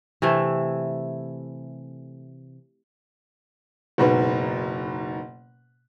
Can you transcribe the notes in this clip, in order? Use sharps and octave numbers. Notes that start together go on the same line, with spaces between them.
C3 E3 A3
F#1 G#2 B2 B4